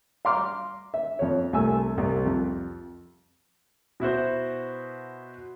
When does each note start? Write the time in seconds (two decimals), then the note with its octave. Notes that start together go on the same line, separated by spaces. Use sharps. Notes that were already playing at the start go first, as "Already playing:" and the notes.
0.25 F5 A#5 C6 D6 F6
0.94 E5
1.19 F2 C#5
1.53 C2 A3 G#5 E6
1.98 C2
2.25 F2
4.00 B2 E4 F#4 C5